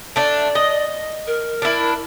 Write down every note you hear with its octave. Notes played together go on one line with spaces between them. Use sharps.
A3 D4 D5
D#5
A#4
D4 E4